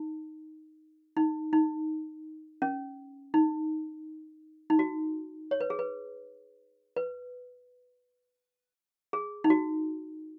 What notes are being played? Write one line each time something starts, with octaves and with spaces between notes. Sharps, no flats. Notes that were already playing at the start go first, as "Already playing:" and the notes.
Already playing: D#4
D#4
D#4
C#4
D#4
D#4
F#4
C#5
B4
G#4
B4
B4
G#4
D#4
F#4